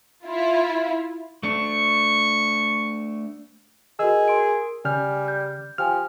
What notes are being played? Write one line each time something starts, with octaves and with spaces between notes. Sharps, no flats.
E4 F4
A3 D4 C#6
F#4 G#4 A#4 D#5 E6
A#4 C6 D7
C#3 G3 G#5 F6 G6
G6
F3 G4 G5 G#5 F6